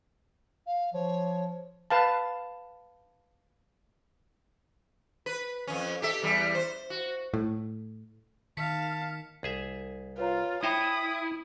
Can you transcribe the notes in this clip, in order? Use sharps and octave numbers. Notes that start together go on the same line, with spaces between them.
F5
F3 C#5
B4 F5 A5
B4
F2 C#4
G4 A4 E5
E2 G3
C5
F#4
A2
D#3 F5 A5 B6 C#7
C2 G#4 E5
F4 B4 C#5 A#5
E4 C5 C#5 D#5 G5 B5 D#6